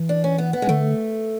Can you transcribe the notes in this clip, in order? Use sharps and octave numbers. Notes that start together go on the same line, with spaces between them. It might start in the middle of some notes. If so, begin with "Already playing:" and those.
Already playing: E3
D4
C#4
B3
B3
G#3
D3 A3